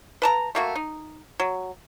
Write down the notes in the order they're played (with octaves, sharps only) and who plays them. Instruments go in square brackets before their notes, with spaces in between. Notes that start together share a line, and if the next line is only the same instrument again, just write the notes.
[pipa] B4 A5 A#5
A3 A#3 F#4
D#4
F#3